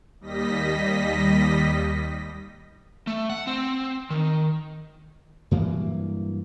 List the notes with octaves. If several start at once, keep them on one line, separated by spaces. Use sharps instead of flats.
D#2 G3 D#5 A#6 B6
A3
F#5
C4
D#3
G2 E3 F#3 A#3